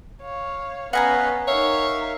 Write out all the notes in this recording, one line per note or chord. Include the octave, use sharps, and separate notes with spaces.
C#5 F5
B3 C#4 B4 D#5 F5 F#5 G#5 A#5
D#4 A#4 C#5 E5 F5